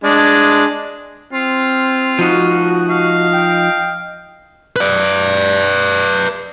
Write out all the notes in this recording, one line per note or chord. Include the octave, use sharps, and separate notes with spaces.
G#3 D4
C4 F4
F3 D#4 F#4
D#5 F5
G5
B4 D5